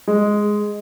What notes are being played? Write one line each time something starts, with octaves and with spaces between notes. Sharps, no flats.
G#3